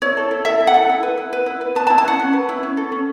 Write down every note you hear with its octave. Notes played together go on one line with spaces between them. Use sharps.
E4 C#5
A4
E4
A4 E5
E4
F#5
A4
E4
B4
E4
B4
E4
B4
B4 A5
A5
E4
A5
C#4 F#5
C#4
B4
E4
C#4
A4
C#4